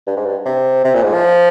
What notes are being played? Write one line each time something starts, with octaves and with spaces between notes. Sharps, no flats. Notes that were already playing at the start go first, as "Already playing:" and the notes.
G2
G#2
G2
C3
C3
A#2
G#2
F3